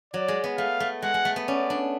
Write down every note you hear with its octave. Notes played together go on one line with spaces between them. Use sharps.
F#3 D5
G#3
B3
A3 F5
A3
G#3 F#5
G#3
A3
B3
C#4 D5
D4